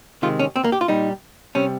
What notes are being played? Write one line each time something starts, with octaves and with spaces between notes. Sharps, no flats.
C3 D#3 G#3 F4
C#4
C4
A#3
G4
F4
A#2 G3 D#4
C3 G3 C#4